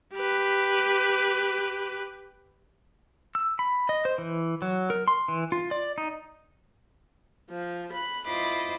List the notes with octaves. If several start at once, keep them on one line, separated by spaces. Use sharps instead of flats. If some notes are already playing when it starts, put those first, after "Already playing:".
G4 B4
E6
B5
D#5
C5
E3
F#3
A#4
C6
E3
F4
D5
D#4
F3
B5 F#6
E4 F4 C5 D#5 B5 D6